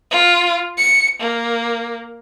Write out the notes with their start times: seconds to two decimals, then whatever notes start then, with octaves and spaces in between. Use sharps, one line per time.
0.11 F4
0.78 C#7
1.21 A#3